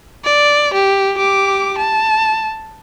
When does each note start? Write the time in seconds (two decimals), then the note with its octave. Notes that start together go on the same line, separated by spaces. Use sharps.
0.25 D5
0.74 G4
1.18 G4 D6
1.78 A5